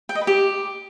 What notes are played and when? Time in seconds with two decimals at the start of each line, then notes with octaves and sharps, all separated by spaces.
0.09 G5
0.15 D#5
0.21 B4
0.27 G4